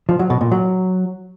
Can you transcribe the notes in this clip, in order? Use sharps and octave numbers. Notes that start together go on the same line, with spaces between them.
F3
F#3
B2
A#2
F#3